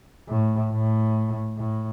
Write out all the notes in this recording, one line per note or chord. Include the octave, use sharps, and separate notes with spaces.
A2
A2
A2